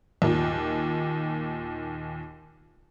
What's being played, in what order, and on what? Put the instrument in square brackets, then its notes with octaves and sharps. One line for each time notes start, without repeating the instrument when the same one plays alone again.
[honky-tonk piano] D#2 A#2